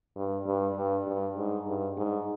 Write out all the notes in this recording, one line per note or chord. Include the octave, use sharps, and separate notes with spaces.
G2
G2
G2
G2
G#2
G2
G#2